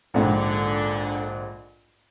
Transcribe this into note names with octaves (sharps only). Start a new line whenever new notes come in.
A#1 G#2 D3